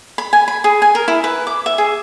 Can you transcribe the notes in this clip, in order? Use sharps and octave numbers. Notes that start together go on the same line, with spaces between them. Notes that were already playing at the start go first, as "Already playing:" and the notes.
B5
G#5
B5
G#4
G#5
A#4
E4
B4
D6
E5
G#4